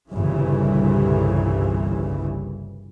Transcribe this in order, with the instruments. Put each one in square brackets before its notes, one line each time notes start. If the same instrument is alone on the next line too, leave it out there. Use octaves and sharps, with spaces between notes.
[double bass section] G1 C2 G2 A#2 C#3 E3